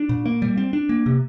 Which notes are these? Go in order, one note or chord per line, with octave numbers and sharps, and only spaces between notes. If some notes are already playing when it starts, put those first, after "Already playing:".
Already playing: D4
A#2
A#3
G3
C4
D4
A#3
C3